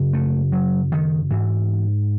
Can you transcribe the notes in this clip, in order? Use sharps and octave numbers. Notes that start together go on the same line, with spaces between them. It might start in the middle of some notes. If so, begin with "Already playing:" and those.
Already playing: F#2 C#3
A3
F#3
D#3
G#2 E3